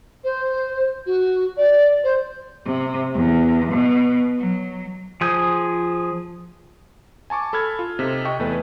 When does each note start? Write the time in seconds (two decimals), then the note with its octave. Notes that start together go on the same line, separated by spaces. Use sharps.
0.24 C5
1.06 F#4
1.57 D5
2.03 C5
2.65 C3
3.14 E2
3.71 B2
4.38 F#3
5.21 F3 G#4 G6
7.30 G#5 A5 C#6 D6
7.53 A4 B5 F6 G#6
7.79 F4
7.99 C3 D#4 A4
8.25 D#5 G5 C#6
8.39 E2 A3 B4